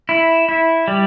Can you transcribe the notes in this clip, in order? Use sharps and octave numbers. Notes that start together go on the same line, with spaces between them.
E4
E4
G3